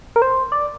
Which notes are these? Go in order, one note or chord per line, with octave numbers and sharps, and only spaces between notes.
A#4
C5
D5